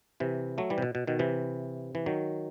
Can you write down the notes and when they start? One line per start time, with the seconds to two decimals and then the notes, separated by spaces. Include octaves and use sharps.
0.20 C3 E3
0.58 F#3 A3
0.70 E3 G3
0.78 C3
0.82 B2
0.95 B2
1.07 B2 D#3
1.19 C3 E3
1.95 E3
2.06 D#3 F#3